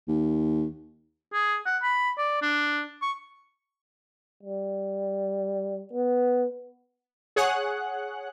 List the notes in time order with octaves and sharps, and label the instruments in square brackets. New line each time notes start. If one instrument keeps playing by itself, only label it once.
[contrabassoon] D#2
[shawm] G#4
F#5
B5
D5
D4
C#6
[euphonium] G3
B3
[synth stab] G#4 C#5 F#5 F#6